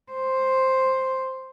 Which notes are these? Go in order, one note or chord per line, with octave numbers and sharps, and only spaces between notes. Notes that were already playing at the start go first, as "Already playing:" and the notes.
C5